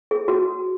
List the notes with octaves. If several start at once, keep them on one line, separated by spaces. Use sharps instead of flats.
G#4
F#4